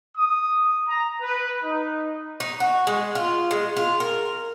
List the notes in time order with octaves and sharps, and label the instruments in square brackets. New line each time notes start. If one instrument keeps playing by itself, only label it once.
[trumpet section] D#6
A#5
B4
D#4
[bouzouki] D#4
F#4
G#3
F4
G#3
F4
A#4